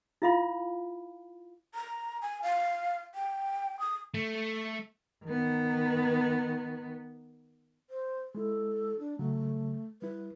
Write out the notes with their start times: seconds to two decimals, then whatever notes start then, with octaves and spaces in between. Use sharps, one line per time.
0.22 E4 F4 E5 F5 B5
1.75 A#5
2.22 G#5
2.42 F5
3.15 G5
3.80 D#6
4.14 A3
5.25 D#3 B3
7.90 C5
8.35 G#3 E4 A4
8.99 D4
9.19 C#3 F#3 A3
10.02 G3 E4 B4